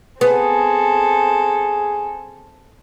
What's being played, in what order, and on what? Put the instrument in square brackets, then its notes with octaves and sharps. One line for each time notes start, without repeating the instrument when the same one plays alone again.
[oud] B3 [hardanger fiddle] C4 A4 [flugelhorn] G#4